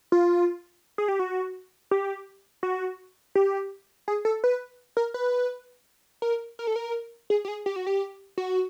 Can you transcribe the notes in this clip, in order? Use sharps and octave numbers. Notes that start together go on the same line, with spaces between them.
F4
G#4
G4
F#4
G4
F#4
G4
G#4
A4
B4
A#4
B4
A#4
A#4
A4
A#4
G#4
G4
G#4
G4
F#4
G4
F#4